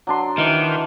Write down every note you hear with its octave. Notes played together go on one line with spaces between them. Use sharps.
F#3 D4 C6
D#3 E3